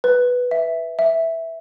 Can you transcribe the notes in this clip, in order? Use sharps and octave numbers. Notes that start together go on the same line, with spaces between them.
B4
E5
E5